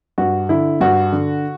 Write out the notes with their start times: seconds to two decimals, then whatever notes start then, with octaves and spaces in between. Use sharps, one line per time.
0.18 G2 F#4
0.49 D3 E4
0.81 G2 F#4
1.12 D3